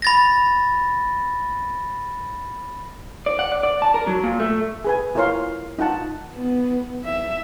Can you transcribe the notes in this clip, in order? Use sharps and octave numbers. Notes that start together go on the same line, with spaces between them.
B5 A6 A#6
D5
F#5
D5
D5
A5
A#4
F#3
A#2
A3
G#4 B4 G#5
E4 F4 A#4 C#5 F5 C6
D#4 F4 F#5 A5
B3
E5